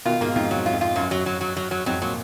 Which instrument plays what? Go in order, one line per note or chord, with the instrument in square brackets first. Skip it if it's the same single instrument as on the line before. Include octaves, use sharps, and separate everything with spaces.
[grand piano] B2 D#3 [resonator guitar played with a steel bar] F4
[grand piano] G#2 B2 [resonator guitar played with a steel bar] A#3
[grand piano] F2 G#2 [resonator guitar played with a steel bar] F4
[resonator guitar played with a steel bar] F#3
F4
[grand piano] F2
[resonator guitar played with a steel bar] F4
[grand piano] F#2 [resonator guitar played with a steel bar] F#3
[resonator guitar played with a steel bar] F#3
F#3
F#3
F#3
F#3
[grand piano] F2 G#2 [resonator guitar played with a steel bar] F#3
[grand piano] A#2 [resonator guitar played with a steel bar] F#3